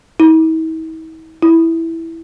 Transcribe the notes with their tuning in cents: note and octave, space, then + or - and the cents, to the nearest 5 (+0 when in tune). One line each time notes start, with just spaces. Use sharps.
E4 -45
E4 -5